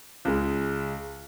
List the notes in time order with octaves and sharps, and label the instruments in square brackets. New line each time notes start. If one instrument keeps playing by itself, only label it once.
[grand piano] C#2 C#3 G#3